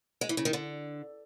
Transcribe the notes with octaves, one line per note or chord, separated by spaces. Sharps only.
G#3
E3
C#3
D#3
D3